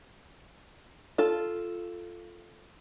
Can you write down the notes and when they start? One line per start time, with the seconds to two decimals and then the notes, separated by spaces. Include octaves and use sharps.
1.18 F4 A4